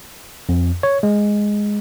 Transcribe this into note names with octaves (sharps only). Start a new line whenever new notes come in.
F2
C#5
G#3